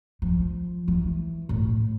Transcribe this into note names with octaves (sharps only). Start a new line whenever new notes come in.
F3
E3
A2